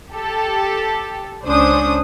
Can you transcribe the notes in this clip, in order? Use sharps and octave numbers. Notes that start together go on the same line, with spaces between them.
G4 A4
C#2 C#4 D4 C5 D#6